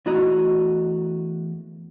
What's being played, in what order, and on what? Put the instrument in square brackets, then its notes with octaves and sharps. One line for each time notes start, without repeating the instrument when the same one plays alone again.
[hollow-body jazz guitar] E2 A3 E4 F#4 D#5 A#5